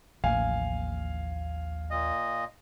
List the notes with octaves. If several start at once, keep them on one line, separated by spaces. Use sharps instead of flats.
A1 D#2 F3 A#3 F5 G#5
A#2 D#5